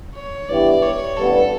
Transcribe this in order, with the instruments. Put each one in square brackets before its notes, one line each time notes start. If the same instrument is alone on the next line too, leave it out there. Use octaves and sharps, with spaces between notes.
[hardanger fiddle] C#5
[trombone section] G2 E3 B3 E4 G4 [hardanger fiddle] D5
[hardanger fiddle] C#5
[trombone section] A1 G2 D3 G3 B3 [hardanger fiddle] A4